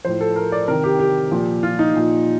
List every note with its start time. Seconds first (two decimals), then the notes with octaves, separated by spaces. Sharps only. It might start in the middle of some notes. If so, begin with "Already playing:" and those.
0.05 A2 F3 C5
0.21 A4
0.36 A#4
0.52 D5
0.68 C3 D#3 A#4
0.84 G4
0.99 G4
1.31 A#2 F3
1.63 F4
1.79 D#4
1.94 A#2 F3